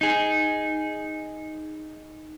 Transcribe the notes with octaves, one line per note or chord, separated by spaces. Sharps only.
D#4 G#4